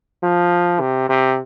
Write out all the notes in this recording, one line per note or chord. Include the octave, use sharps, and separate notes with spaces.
F3
C3
C3